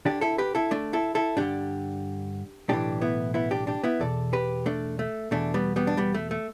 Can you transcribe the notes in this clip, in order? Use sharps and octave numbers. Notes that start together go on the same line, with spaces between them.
D2 D3 D4 G4
E4 A4
G4 B4
E4 A4
A3 D4
E4 A4
E4 A4
G2 D3 D4 G4
B1 A2 E3 D4 G4
B3 E4
B3 E4
D4 G4
D4 G4
B3 E4
E2 B2 A4 D5
G4 B4
A3 D4
A3
E2 B2 A3 D4
G3 B3
G3 B3
D4
G3 B3
A3
A3